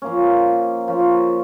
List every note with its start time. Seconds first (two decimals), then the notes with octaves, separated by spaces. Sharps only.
0.02 F3 A#3 C#4
0.88 F3 A#3 C#4